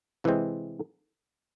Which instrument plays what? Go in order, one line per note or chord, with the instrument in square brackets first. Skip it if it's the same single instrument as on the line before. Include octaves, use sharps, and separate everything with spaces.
[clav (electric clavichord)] C3 E3 G#3 C4